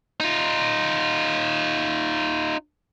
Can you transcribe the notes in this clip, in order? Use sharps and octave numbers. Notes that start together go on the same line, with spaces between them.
D#4 F4